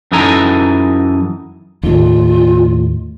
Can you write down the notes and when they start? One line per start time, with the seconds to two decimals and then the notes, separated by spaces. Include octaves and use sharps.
0.12 F#2 E3 D#4 A4 G#5 A#5
1.83 D#2 A2 F4